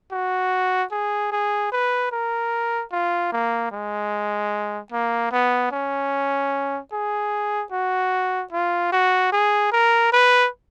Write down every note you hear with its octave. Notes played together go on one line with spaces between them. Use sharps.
F#4
G#4
G#4
B4
A#4
F4
A#3
G#3
A#3
B3
C#4
G#4
F#4
F4
F#4
G#4
A#4
B4